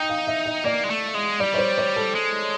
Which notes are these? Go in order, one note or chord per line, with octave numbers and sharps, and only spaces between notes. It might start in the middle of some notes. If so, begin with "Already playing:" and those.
Already playing: D#4 G5
F5
E5
D#5
A#3 D5
G#3
A3
G#3
G3 D5
C#5
C5
C#5
A4
G#3